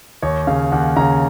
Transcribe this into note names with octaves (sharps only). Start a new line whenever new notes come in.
D#2 C#5
C#3 F5
D#2 F#5
C#3 A#5